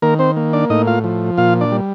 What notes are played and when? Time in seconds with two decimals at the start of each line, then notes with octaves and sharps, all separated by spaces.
0.02 D#3 A#3 A#4
0.19 C4 C5
0.37 A#3
0.53 D4 D5
0.70 A2 D#4 D#5
0.87 F4 F5
1.04 F3
1.38 A#2 F4 F5
1.61 D4 D5
1.72 G3